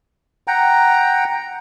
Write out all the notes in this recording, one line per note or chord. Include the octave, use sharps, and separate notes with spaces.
F#5 G5 A#5